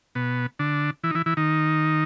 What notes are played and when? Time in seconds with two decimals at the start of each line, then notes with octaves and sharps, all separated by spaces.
0.15 B2 B3
0.59 D3 D4
1.03 E3 E4
1.10 D#4
1.15 E3 E4
1.26 E3 E4
1.37 D#3 D#4